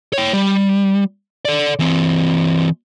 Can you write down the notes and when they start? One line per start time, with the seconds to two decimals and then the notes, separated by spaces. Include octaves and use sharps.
0.13 C#5 G5
0.33 G3
1.45 A4 D5
1.79 E3 C4